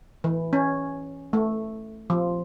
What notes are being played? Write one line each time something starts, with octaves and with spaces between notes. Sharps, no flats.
E3
C#4
A3
F3